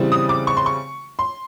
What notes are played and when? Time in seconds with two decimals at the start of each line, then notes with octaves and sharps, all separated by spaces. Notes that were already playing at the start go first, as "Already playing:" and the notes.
Already playing: C#3 E3 G3 C4
0.12 D#6
0.29 D6
0.47 C#6
0.57 C6
0.66 C#6
1.19 C6